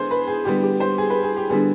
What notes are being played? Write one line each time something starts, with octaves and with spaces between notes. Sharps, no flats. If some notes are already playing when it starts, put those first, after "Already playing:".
Already playing: D3 G#3 B3 G#4 C5
B4
G#4
D3 G3 B3 G4
G4
C5
G#4
B4
G#4
G4
D3 G3 B3 G#4